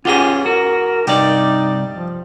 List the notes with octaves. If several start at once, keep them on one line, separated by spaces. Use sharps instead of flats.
E2 G#2 C#4 F4 G4 G#4 A#5
F#4 A#4
C2 G2 G3 D#4 G4 D5
F3